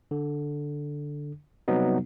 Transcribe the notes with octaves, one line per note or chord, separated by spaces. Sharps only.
D3
C3 F#3 G3 B3 D#4